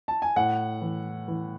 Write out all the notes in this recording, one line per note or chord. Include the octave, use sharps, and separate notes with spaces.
A5
G#5
A2 F#5
E3
E3